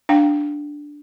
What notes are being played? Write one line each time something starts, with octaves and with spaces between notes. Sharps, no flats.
D4 F5 G5